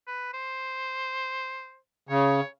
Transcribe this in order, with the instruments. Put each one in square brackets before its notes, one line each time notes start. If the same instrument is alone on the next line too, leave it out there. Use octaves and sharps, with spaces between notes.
[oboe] B4
C5
[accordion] C#3 [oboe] C#5